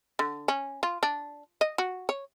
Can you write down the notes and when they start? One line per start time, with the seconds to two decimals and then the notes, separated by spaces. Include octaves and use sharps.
0.19 D3
0.48 C#4
0.83 F4
1.03 D4
1.61 D#5
1.78 F#4
2.09 C#5